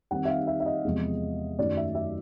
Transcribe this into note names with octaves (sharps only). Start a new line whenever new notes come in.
D#3 G3 C4 D#4 F#5
E5
F5
E5
E5
D#5
E2 C3 F3 G#3 C4
F#2 D#3 F#3 A3 D5
E5
E5